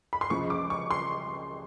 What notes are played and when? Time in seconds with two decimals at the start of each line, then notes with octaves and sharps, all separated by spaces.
0.13 B5
0.21 C6
0.30 C#2 C#3 F3 C#6
0.50 D6
0.70 C#6
0.91 C6